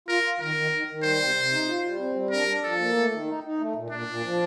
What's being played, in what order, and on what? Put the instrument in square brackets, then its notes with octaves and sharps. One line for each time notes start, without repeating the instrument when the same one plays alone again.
[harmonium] F4 [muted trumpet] A#4
[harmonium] F4
[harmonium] D#3 [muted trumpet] A#4
[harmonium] D#3
D#3
D#3
[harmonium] G3 [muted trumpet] C5
[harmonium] C3
C3
D#4
F4
G3
C4
G3
[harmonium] D4 [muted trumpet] A#4
[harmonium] D4
[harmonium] F3 [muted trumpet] A4
[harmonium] A#3
A3
D#3
D#4
D#4
A3
A#2
[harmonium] A#2 [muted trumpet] D4
[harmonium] A#2
F3